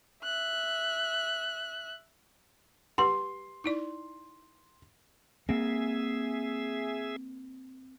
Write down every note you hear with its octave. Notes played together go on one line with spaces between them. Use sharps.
E5 F#6
G4 B4 F#5 C6
D#4 E4 D5
A#3 C4 G#4 E5